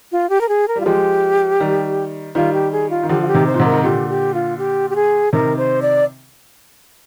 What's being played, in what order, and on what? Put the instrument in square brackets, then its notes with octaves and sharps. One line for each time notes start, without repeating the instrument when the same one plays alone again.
[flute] F4
G4
A#4
G#4
A#4
[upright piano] G3 [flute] F4
[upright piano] F3 G#3 [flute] G4
[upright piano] D#3 G3
[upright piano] D#3 G3 [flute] F4
[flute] G4
G#4
F4
[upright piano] D#3
[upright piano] D3 F3 [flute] G4
[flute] F4
G4
[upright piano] C3 D#3
[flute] C5
[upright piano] A#2
G#2 C3
[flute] A#4
[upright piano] D#3
[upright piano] A#2 D3 [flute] G4
[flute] G4
F4
G4
G4
G#4
[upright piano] C3 D#3 [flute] A#4
[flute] C5
D5